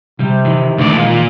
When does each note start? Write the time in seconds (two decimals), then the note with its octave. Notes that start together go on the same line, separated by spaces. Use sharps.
0.20 C3 G3
0.45 D#3 E3
0.78 D2 D5
0.92 A#2 G#3
1.07 F4